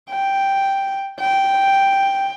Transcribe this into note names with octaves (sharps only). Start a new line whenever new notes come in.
G5
G5